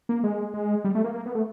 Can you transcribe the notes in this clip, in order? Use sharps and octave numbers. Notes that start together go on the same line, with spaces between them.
A#3
G#3
G#3
G3
A3
A#3
A#3
B3
A3